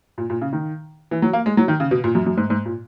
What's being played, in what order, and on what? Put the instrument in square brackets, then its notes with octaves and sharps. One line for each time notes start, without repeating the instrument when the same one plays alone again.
[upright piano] A#2
A#2
C#3
D#3
E3
F#3
A#3
G#3
F#3
D#3
C#3
B2
A#2
F#2
F#2
G#2
G#2
A#2